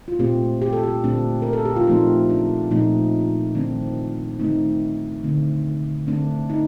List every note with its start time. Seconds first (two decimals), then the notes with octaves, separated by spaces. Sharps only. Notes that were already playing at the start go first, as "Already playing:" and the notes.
0.08 F4
0.19 A#2 A3 C4 G4
0.62 G4
0.73 A4
0.83 G4
1.04 A#2 A3 C4 D4
1.42 A#4
1.53 A4
1.65 G4
1.76 F4
1.87 A#2 F3 A3 C4 D#4
2.30 D4
2.71 A#2 F3 A3 C4 D#4
3.55 D#3 A3 C4 D4
4.40 D#3 A3 C4 D#4
5.23 D3 A3 C4
6.07 D3 A3 C4 D4
6.50 D#4